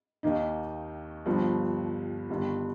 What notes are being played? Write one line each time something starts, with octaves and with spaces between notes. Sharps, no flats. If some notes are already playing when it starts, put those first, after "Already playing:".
D#2 D#3 A#3 D#4
G1 G2 F3
G1 G2 D#3